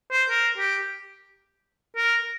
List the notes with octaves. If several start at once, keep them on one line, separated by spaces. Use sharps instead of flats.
C5
A#4
G4
A#4